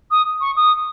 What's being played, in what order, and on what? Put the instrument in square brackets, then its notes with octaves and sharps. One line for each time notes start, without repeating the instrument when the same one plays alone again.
[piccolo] D#6
C#6
D#6